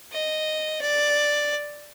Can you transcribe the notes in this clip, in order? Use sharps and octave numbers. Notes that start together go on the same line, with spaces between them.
D#5
D5